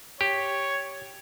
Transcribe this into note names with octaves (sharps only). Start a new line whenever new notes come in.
G4 C#5